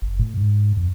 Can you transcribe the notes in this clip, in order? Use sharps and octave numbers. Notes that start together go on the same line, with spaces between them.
F#1
A2
G#2
F2